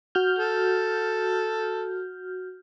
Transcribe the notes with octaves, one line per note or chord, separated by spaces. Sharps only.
F#4 F6 G6
A4